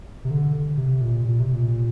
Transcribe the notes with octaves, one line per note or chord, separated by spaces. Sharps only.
C3
D3
C3
A#2
A#2
C3
A#2